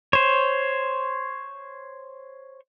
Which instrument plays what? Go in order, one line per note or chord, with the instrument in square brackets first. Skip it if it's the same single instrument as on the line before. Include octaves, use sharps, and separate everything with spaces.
[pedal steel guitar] C5 C#5